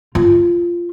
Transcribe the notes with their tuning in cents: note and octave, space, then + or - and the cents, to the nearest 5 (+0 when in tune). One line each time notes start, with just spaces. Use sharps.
F4 -10